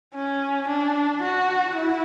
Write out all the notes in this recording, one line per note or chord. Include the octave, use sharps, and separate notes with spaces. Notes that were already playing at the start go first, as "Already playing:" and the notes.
C#4
D4
F#4
E4